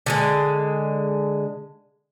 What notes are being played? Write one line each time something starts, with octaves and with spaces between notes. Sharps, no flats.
D3 F#3 G#3